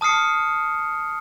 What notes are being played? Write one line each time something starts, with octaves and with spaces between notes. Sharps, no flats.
A5 D#6 F6 C7 C#7